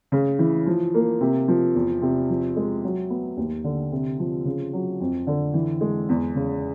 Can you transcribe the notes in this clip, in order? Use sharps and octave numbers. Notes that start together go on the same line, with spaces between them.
C#3
E3
F3
A#3
C3
F3
E2
C3
F3
G#3
F#3
B3
D#2
D3
C3
F3
C#3
F#3
F2
D3
E3
G#3
E2
C#3